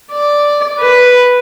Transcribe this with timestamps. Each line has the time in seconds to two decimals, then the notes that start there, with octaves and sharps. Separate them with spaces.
0.12 D5
0.80 B4